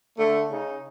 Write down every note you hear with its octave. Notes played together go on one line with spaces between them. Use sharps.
D3 A3
C#3 D#4